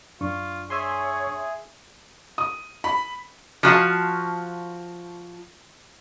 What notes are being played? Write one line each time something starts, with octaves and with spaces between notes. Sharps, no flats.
F#2 D4 F4 C#6
G#4 C#5 E5 G#5 C6
D#6
B5
F3 F#4 F5 A5